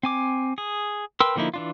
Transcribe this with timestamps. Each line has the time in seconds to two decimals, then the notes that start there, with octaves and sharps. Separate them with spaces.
0.03 C4 G#5 D6
0.58 G#4
1.20 A#4 B4 G5 C6 E6
1.36 D3 F3 A#3 D#4 E4
1.54 E3 D4 F4